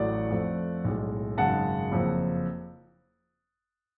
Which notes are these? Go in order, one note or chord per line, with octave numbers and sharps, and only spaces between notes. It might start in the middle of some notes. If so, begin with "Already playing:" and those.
Already playing: A1 A2 F#3 A3 D5 F#5
F2 F3 A3
B1 A2 G#3
G#1 F#2 C#3 G#3 F#5 A5
F#1 F2 F3